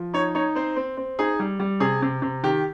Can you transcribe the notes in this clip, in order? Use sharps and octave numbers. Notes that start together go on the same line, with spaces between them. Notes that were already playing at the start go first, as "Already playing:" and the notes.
Already playing: F3
D#4 C#5
D#4 C#5
C4 C5
C4
C4
D#4 G#4
G3
G3
C3 G#4
C3
C3
D#3 G4